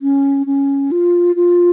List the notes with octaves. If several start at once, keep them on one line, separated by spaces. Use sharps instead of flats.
C#4
C#4
F4
F4